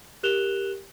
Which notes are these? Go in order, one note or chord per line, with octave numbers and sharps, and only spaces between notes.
G4 A#4 F#6 E7 F7 G7